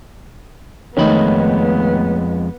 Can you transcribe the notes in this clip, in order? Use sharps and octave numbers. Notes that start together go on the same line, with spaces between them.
F2 D#3 G#3 A3 B3 D#4 C#5 B5